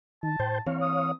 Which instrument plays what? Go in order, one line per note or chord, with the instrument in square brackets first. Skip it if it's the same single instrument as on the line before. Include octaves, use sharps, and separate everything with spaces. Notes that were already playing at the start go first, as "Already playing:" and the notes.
[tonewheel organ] D#3 [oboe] A5
[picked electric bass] A2 [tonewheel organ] C5 G5
[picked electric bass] E3 C4 [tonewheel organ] C#5 F5
[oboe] D#6